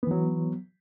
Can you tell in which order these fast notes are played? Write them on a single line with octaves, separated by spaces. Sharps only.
B3 E3 F#3